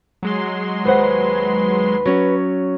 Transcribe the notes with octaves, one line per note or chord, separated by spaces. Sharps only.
F#3 G#3 C6
D#2 B4 C5 F#5
F#3 C#4